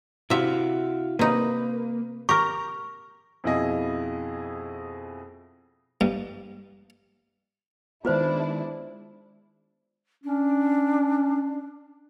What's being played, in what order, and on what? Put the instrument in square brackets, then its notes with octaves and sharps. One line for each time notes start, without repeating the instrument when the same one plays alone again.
[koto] C3 E5 [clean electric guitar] E4 F#4 F5
[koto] C3 D#4 [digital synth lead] A#3 [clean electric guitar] B4
[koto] G4 A#4 [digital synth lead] A#5 [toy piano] C#6
[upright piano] F2 B2 E4 F4 G#4 D#5
[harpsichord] G2
[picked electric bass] D#3 B3 [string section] G#3 D4 E4 [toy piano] F4 B4 C5
[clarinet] C#4 [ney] D4